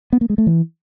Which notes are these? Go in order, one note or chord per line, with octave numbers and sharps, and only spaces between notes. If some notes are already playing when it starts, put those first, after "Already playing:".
B3
A#3
G#3
A3
E3